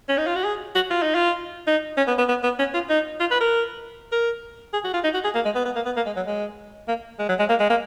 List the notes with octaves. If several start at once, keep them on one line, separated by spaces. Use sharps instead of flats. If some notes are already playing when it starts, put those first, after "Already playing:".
C#4
D#4
F4
F#4
G#4
F#4
F4
D#4
F4
D#4
C#4
B3
B3
B3
B3
C#4
F4
D#4
F4
B4
A#4
A#4
G#4
F#4
F4
D#4
F#4
G#4
A#3
G#3
B3
B3
A#3
B3
A#3
G#3
F#3
G#3
A#3
G#3
F#3
G#3
A#3
G#3
A#3